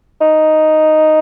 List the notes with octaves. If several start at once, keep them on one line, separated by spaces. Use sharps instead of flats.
D#4